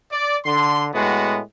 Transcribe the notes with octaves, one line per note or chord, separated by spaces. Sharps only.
D5
D3 C6
A2 G#3 B3 F#4